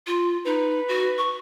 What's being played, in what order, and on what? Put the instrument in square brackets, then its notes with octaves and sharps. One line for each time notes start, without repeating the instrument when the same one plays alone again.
[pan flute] F4
[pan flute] D#4 [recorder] B4
[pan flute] F#4
C#6